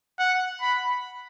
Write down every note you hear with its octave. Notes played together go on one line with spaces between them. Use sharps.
F#5
B5